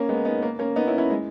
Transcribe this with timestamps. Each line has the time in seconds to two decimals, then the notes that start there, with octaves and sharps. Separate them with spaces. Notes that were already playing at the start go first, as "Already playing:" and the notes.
Already playing: A#3 C#4
0.09 G#3 B3
0.25 B3 D#4
0.42 A#3
0.59 A#3 C#4
0.76 B3 D#4
0.87 C#4 E4
0.98 C#4 E4
1.10 G#3